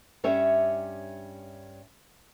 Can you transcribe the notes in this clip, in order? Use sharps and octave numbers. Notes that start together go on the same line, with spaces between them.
G2 G3 C#4 C#5 E5